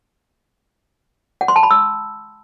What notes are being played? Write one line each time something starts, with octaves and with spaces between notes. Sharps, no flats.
F#5
C6
A5
B5
E6